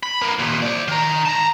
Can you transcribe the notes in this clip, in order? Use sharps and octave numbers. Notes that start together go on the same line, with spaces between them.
B5
B3 A#4
D#2 A#2
C5 D5
D#3 A#5
A5 A#5